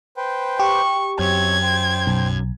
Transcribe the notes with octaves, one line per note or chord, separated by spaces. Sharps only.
B4 C5 G5
G4 C#6
F#2 C4 C#5 G#6
C5 G5
B1